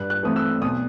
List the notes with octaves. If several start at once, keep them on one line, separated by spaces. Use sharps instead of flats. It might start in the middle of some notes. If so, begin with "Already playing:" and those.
Already playing: G2 F#6
F#6
E3 A3 C4 D#6
E6
B1 D#6